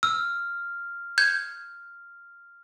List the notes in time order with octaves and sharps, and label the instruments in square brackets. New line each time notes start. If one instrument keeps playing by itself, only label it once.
[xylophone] E6 [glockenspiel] F6
[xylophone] G6 G#6